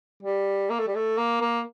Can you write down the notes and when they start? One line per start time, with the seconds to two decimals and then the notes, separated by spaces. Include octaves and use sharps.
0.23 G3
0.70 A#3
0.79 A3
0.87 G3
0.95 A3
1.18 A#3
1.41 A#3